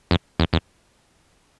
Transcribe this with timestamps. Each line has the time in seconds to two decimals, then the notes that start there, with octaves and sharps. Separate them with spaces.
0.11 F2
0.40 E2
0.53 E2